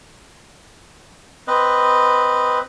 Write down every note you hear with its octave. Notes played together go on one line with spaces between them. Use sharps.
C4 B4 D#5